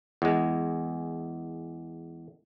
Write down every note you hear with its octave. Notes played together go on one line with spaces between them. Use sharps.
E2 G#3